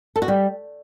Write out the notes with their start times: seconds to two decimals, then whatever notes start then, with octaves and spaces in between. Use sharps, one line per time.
0.16 A4
0.22 F#4
0.28 G3